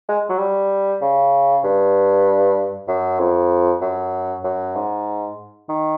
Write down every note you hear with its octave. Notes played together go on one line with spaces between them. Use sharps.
G#3
F#3
G3
C#3
G2
F#2
F2
F#2
F#2
G#2
D#3